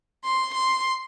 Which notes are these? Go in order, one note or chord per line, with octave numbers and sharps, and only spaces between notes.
C6
C6